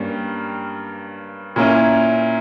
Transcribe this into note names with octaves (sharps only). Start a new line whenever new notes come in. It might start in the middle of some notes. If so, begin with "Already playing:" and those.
Already playing: G2 G3 A#3 C#4
A#2 A#3 C#4 E4